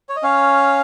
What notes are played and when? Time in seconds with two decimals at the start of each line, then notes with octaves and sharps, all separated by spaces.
0.09 C#5
0.16 D#5
0.23 C#4 C#5 F5